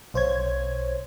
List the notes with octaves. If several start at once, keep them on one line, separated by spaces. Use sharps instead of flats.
B1 C5 C#5 G#6